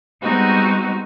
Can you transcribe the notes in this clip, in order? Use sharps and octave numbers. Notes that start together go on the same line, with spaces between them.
G3 G#3 B3 C4 D#4 F#4